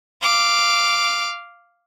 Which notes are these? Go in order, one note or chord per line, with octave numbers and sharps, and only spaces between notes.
F5 D6